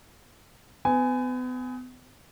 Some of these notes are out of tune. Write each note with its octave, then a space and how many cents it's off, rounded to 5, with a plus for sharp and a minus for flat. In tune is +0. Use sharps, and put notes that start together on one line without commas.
B3 +35 G#5 +0